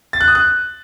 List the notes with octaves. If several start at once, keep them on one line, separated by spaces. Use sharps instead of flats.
A6
F#6
D#6
F#6